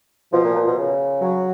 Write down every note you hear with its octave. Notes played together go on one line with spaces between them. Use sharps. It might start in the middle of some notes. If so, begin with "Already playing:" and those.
B2 F3
A#2
A#2
B2
C#3
F#3